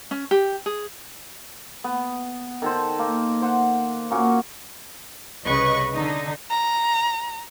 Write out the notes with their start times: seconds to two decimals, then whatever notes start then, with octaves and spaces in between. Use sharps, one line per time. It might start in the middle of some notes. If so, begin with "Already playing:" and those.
0.11 C#4
0.31 G4
0.66 G#4
1.84 B3
2.62 D#3 A4 C5
2.99 A#3
3.42 C5 F#5
4.11 A#2 A#3 C#4 F#4
5.45 C2 C#3 B4 D#5 C#6
5.94 D3 D#4
6.51 A#5